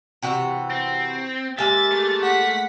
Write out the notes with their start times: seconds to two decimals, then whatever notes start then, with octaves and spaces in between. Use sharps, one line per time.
0.22 C3 E3 F#4
0.71 C4
1.58 G#3 A#3 G4 E5 A6
1.91 A3
2.21 F#5 B6